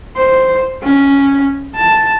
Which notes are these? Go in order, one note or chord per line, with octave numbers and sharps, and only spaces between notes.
C5
C#4
A5